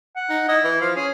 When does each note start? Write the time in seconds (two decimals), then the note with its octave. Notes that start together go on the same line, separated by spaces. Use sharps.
0.16 F#5
0.30 D#4
0.48 E4 D#5
0.64 E3
0.81 F3 F5
0.96 C#4 G#4